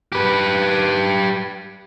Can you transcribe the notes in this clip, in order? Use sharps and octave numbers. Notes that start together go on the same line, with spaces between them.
G4 B4